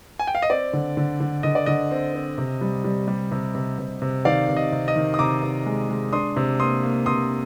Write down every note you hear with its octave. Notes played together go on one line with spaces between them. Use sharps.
G#5
G5
F5
D#5
C4 D5
D3
D3
D3
D3 D#5
D5
D3 D#5
C4
C4
C3
G3
G3
G3
C3
C3
C3
C3
D#3 D5 F5
C3
D#5
C3
D#5
D#3
D#6
C3 A#5 D6
C3
G#3
G#3
D4 C6 D#6
C3
A#3 C6 D#6
A#3
C3 C6 D#6